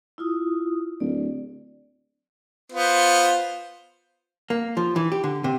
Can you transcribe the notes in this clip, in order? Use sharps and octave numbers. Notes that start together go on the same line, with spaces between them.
E4 F4 D#6
D1 D5
B3 F4 C5
A#3
F3
E3
G4
D3
C3